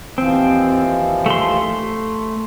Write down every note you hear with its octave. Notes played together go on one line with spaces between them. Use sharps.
D#2 E3 F3 C4
A3 C6